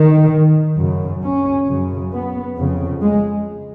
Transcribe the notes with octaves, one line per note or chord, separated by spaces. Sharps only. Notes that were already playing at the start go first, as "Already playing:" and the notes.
Already playing: D#3
F#2 C#3
C#4
F#2 C#3
B3
F2 C#3
G#3